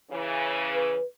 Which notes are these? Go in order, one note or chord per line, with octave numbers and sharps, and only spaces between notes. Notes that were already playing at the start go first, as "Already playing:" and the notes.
C#3 E3
B4